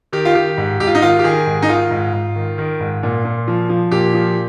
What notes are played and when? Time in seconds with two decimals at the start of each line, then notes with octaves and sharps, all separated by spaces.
0.13 D#3 G4
0.25 F4
0.35 D#3 G4
0.57 G#2
0.80 G#2 G4
0.87 F4
0.95 D#4
1.02 D#3 F4
1.19 G4
1.24 D#3 G#4
1.47 G#2
1.62 D#4
1.69 D#3 F4
1.91 G#2
2.13 G#2
2.36 D#3
2.58 D#3
2.80 G#2
3.03 A#2
3.25 A#2
3.47 F3
3.69 F3
3.91 A#2 G4
4.14 F3